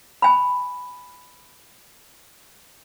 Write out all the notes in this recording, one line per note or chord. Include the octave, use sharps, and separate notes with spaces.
G#5 B5